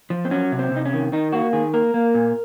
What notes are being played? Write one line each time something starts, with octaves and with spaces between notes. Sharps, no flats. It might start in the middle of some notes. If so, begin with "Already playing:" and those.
F3
C4
F#3 C#4
C3
C4
C3 D#4
C#4
D#3
D#3 D#4
A#3 F#4
D#3 G#4
A#3 A#4
A#3
A#2